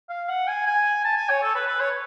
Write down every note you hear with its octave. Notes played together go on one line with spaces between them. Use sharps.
F5
F#5
G#5
G#5
A5
G#5
C#5
A4
B4
B4
C#5